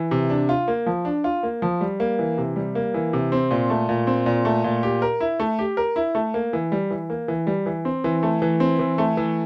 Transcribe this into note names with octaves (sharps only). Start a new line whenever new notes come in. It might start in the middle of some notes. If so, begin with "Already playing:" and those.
Already playing: E3
C3
D4
F4
A#3
F3
D4
F4
A#3
F3
G3
A#3
E3
C3
G3
A#3
E3
C3
C4
A#2
A3
A#2
C4
A#2
A3
A#2
G4
A#4
E4
A3
G4
A#4
E4
A3
A#3
E3
G3
E3
A#3
E3
G3
E3
C4
E3
A3
E3
C4
E3
A3
E3